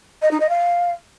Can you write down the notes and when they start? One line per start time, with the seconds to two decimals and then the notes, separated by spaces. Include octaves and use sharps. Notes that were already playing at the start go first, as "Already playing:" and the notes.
0.22 D#5
0.31 D#4
0.40 D#5
0.49 F5